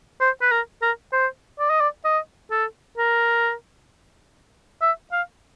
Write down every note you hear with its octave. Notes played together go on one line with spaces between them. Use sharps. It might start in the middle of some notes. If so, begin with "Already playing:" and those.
C5
B4
A#4
A#4
C5
D5
D#5
D5
D#5
A4
A#4
E5
F5